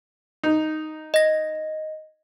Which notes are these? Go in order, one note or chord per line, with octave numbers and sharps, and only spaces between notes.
D#4
D#5 A#6